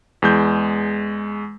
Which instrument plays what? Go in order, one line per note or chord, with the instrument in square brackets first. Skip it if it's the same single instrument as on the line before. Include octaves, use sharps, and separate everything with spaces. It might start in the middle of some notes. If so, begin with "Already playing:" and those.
[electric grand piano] E2 G#3 G6